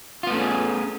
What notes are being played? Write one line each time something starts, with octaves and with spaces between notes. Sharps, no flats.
A3 B3 C#4 F4 G#4